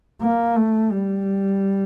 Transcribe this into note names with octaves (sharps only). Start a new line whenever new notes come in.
A#3
A3
G3